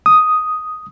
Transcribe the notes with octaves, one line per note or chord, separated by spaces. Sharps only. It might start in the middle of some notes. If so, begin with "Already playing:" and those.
D#6